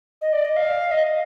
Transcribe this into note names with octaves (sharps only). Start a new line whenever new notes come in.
D#5
D5
D#5
F5
D#5